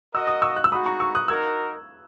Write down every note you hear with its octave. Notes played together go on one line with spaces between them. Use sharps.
F#4 A#4 D#5 E6
D#6
C#6 E6
F#6
E6
G#3 D#4 F#4 B5 D#6
A#5 C#6
C#6 E6
D#6 F#6
D#4 F#4 A#4 E6 G#6